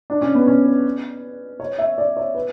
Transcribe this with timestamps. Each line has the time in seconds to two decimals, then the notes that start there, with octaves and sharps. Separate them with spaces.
0.10 D4
0.22 C#4
0.35 B3
0.47 C#4
0.65 B4
1.60 C#5
1.79 E5
1.98 D5
2.17 C#5
2.35 B4